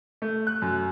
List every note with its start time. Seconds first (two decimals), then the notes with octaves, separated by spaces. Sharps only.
0.22 A3
0.47 F#6
0.62 F#2